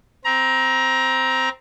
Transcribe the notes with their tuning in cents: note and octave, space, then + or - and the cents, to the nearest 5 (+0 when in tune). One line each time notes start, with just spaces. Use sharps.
C4 -5 A#5 +20